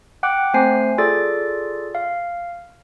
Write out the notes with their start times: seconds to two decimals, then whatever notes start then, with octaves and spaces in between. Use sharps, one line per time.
0.23 F#5 G5 D6 F#6
0.54 A3 C4 C5 G#5 C7
0.98 F4 G#4 A4 D5 A6
1.95 F5